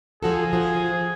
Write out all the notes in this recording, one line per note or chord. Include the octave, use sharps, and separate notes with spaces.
F3 F#4 G#4 A4
F3 F#4